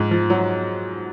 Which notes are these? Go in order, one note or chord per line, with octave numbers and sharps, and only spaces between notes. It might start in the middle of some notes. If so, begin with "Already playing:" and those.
Already playing: G#2 F3
F3
F#3